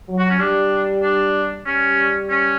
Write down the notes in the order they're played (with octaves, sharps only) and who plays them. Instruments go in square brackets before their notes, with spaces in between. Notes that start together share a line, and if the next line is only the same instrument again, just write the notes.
[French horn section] F#3
[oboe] F#4
C#4
[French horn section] G3 [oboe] D4
[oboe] D4
[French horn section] G3 [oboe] C#4
[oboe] C#4